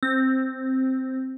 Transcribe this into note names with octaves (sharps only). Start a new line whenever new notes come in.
C4